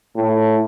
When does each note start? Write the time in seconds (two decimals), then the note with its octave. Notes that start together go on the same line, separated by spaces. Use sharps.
0.15 A2